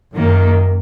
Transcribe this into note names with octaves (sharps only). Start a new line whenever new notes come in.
F#2 D#3 A#3